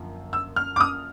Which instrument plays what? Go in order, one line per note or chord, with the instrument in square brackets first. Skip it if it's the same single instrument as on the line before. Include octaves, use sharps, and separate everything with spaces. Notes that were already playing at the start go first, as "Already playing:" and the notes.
Already playing: [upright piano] F#2 D3 F3 A#3
E6
F6
D6
D#6